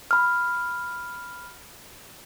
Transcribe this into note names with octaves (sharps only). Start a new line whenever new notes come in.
B5 F6